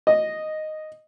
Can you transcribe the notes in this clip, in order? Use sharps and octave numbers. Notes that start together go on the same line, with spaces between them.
D#5